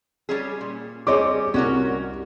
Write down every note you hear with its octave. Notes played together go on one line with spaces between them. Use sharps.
G3 C#4 G#4
A#2
G3 C4 G#4 C#5 D#5 D6
C2 C#4 F#4 A#4